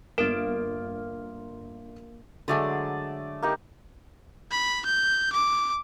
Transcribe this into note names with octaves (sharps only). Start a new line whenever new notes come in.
G1 A#3 F4 A#4 D7
D3 F#3 G#3 A3 D5 D#6
A#3 D#4 G4
B5
G6
D6